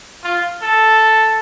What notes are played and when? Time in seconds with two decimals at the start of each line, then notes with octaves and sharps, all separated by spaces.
0.24 F4
0.63 A4